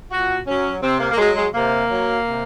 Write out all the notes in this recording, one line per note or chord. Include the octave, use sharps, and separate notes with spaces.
A#2 F#4
F#3 C#4
C3 C4
A#3
A#3
F#3 G#3
G#3
C3 A#3
F#3
C3